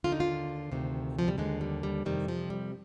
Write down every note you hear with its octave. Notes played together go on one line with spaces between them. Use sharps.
D#2 D3 F4
D#4
F4
D2 C3 D#3
F3
G3
D#2 D3 G#3
G3
G3
F2 C3 D#3 G3
F3
G3